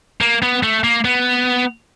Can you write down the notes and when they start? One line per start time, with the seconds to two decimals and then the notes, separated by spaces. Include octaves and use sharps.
0.21 A#3
0.43 B3
0.63 A3
0.84 A#3
1.05 B3